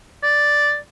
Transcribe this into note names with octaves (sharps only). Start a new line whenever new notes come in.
D5